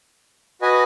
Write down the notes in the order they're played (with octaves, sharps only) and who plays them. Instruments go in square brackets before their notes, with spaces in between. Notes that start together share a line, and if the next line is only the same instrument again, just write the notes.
[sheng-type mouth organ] F#4 B4 D#5 G#5